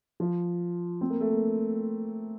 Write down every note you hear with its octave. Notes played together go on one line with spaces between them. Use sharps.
F3
C4
A#3
A3
A#3